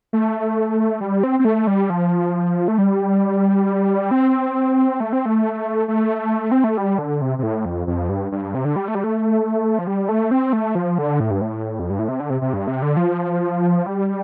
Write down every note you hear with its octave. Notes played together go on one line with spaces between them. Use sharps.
A3
G3
C4
C4
A3
G3
F3
A3
G3
C4
A3
C4
A3
A3
C4
A3
G3
D3
C3
C3
A2
F2
F2
G2
G2
C3
D3
G3
A3
G3
A3
F3
G3
A3
C4
A3
F3
D3
A2
G2
A2
F2
G2
A2
C3
D3
C3
C3
G2
C3
D3
F3
G3